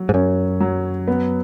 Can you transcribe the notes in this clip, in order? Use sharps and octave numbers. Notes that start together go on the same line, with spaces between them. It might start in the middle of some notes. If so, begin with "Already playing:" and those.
Already playing: F#3
G#2
F#2 C#4
F#3
B3